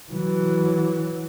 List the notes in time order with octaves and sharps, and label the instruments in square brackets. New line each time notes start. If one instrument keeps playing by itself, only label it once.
[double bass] E3 F#3